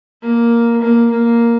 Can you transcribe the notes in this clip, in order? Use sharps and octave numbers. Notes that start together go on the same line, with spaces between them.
A#3
A#3
A#3